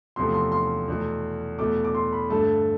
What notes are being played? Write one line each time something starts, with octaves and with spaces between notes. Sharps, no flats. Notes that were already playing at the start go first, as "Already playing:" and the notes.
E2 C3 F3 A3 C6
C6
C6
E2 B2 A3
E2 B2 A3 D6
D6
C6
B5
G2 D3 A3 A5